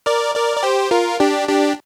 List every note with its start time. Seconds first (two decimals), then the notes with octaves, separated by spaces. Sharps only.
0.06 A#4 D5
0.35 A#4 D5
0.57 D5
0.63 G4 C5
0.91 F4 A#4
1.20 D4 G4
1.48 D4 G4